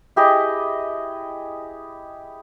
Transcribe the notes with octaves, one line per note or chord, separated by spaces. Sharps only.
E4 G4 G#4 D#5